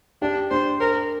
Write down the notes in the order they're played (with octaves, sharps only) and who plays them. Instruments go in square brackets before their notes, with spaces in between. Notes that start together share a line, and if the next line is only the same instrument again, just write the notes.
[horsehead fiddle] D4 [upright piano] G4
[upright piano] D4 [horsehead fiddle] C5
[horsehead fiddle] A#4 [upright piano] C5